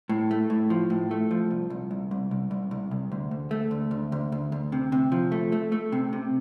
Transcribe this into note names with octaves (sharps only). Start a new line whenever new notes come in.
A2
A3
A2
F3
A2
A3
F3
C2
C2
C2
C2
C2
C2
C2
C2
D2
D2
A3
D2
D2
D2
D2
D2
C3
C3
F3
A3
A3
A3
C3
C3